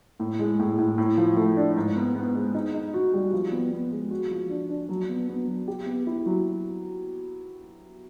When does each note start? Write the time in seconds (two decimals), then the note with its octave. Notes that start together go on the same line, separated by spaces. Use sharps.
0.20 A2
0.39 G#3
0.59 A2
0.78 A2
0.98 A2
1.18 F3
1.37 A3
1.57 D4
1.76 G#2
1.96 B3
2.15 B3
2.35 G#3
2.55 D#4
2.75 D#4
2.94 F#4
3.14 G3
3.33 F3
3.52 B3
3.72 B3
3.91 G#3
4.11 F#4
4.30 F3
4.50 D4
4.70 D4
4.89 F#3
5.09 B3
5.29 B3
5.48 F#3
5.68 G4
5.86 B3
6.07 E4
6.26 F#3